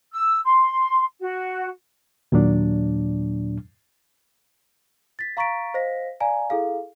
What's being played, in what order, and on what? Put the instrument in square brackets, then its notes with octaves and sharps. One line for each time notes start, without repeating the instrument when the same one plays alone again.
[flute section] E6
C6
F#4
[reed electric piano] D#2 A#2 F#3 D4
[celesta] A6 B6
F5 A#5 C#6 A6 B6 D7
C5 D#5 F5 A#6 B6
D5 F5 G#5 A#5
E4 G#4 A4 F5